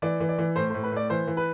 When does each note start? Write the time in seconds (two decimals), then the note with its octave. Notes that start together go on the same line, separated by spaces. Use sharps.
0.02 E3 D5
0.20 E3
0.29 D5
0.38 E3
0.56 A2 C5
0.70 A2 C5
0.83 B4
0.92 A2 D5
1.10 E3 C5
1.27 E3
1.37 B4